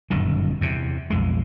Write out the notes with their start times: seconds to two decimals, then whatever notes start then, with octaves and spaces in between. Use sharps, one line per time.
0.10 G1 F#2 A#2 D#3
0.61 E2 C3
1.10 B1 F2 G#3